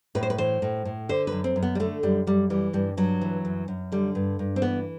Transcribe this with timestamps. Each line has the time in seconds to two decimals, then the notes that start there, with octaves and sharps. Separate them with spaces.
0.15 A2 B4
0.23 C5
0.30 B4
0.38 E3 C5
0.62 A2
0.85 A2
1.09 D3 C5
1.27 F#2 B4
1.44 C4
1.56 F#2
1.63 B3
1.75 G3
1.80 D3 A3
2.03 F#2 G3
2.27 F#2 G3
2.50 E3 G3
2.73 G2 G3
2.97 G2 F#3
3.21 E3
3.45 F#2
3.68 F#2
3.92 D3 G3
4.15 G2
4.39 G2
4.56 C4
4.62 E3 B3